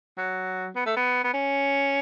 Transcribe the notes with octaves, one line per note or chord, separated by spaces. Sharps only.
F#3
B3
A3
B3
B3
C#4